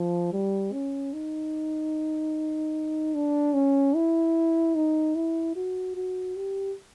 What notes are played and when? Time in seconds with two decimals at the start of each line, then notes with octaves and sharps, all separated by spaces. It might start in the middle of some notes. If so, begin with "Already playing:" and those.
Already playing: F3
0.32 G3
0.73 C#4
1.13 D#4
3.15 D4
3.54 C#4
3.95 E4
4.76 D#4
5.15 E4
5.56 F#4
5.95 F#4
6.36 G4